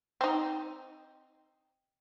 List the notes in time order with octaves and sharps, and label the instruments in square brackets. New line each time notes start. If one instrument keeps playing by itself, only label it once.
[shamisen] C4 D#4